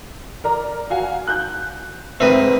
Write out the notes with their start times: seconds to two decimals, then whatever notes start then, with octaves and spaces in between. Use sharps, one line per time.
0.44 A#4 D5 A#5
0.90 F#4 F5 G#5
1.27 F#6 G6
2.20 G#2 C4 A#4 B4 D#5 E5